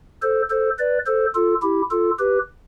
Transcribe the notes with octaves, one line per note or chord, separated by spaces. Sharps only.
A4 C5
A4 C5
B4 D5
A4 C5
F4 A4
E4 G4
F4 A4
G4 B4